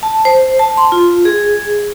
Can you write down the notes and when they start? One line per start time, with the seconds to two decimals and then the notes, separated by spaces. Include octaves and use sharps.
0.03 A5
0.25 C5
0.59 A5
0.77 C6
0.92 F4
1.25 G#4